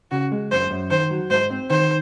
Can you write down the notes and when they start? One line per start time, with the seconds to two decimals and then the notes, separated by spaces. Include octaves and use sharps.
0.11 C#3 F#4
0.32 G#3
0.51 F#2 C5
0.70 F#2
0.90 D#3 C5
1.10 F#3
1.30 G#2 C5
1.50 C4
1.70 D#3 C5